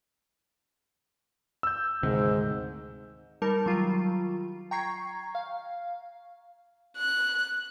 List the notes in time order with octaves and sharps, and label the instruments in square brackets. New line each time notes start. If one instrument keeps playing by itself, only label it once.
[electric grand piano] E6 G6
[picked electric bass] D2 C3 D#3 [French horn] G#2
[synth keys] G3 D#4 A#4 A5
D#3 F#3 G3 F4
G5 A#5 C#6 G#6 C7
F5
[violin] F#6